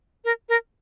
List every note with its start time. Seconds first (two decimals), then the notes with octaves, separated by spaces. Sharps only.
0.25 A#4
0.49 A#4